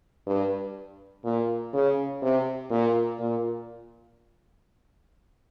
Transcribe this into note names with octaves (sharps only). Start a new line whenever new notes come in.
G2
A#2
C#3
C3
A#2
A#2